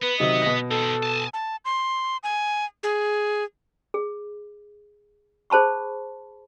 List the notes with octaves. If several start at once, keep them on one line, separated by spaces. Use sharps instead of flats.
B3 B4
C3 D#3 F#3 D#5
B2 A#6
C4 D#4 A4
G#5 A5
A5
C6
G#5
G#4
G#4
G#4 C5 A5 B5 C#6